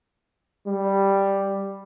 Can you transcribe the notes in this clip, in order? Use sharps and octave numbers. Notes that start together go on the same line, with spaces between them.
G3